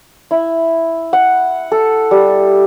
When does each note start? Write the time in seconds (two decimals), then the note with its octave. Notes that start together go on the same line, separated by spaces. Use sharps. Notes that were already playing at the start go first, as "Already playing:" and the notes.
0.31 E4
1.13 F#5
1.72 A4
2.11 G3